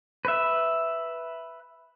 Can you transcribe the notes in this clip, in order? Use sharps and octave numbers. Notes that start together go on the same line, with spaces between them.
B4 E5